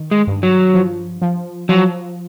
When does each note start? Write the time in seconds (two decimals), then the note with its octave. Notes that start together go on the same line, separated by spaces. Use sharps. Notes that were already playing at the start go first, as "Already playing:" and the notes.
Already playing: D#3
0.11 G#3
0.27 G2
0.43 F#3
0.74 F3
1.22 F3
1.69 F3 F#3